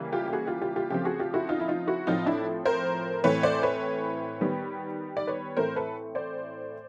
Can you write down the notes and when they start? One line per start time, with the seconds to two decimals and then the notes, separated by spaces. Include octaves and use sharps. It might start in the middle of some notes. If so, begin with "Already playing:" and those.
Already playing: C#3 E3 G3 A#3
0.13 F4 G4
0.28 G4
0.33 F#4 G#4
0.47 F4 G4
0.62 F4 G4
0.76 F4 G4
0.90 C#3 F3 A3 C4 F4 G4
1.05 F#4 G#4
1.20 F4 G4
1.34 E4 F#4
1.49 D#4 F4
1.60 E4
1.68 D#4 F4
1.87 E4 F#4
2.07 A2 F3 A3 C4 D#4 F4
2.26 D4 E4
2.65 A#4 C5
3.24 A2 E3 A3 C4 B4 C#5
3.43 C5 D5
3.63 B4 C#5
4.41 D#3 G3 B3
5.17 D5
5.27 B4 C#5
5.57 A2 E3 A3 C4 A#4 C5
5.76 A4 B4
6.15 C5 D5